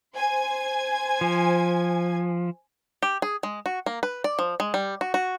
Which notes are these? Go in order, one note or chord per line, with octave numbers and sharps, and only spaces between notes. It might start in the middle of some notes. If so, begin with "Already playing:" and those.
C5 G#5 G#6
F3
G4
G#4
G#3
F#4
A#3
B4
D5
F3
G#3
G3
F#4
F#4